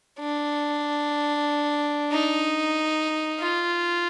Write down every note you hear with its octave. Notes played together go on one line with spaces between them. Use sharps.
D4
D#4
F4